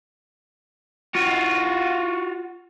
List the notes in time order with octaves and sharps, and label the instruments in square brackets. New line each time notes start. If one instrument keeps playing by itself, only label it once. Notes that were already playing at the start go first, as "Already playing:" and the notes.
[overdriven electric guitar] F4 F#4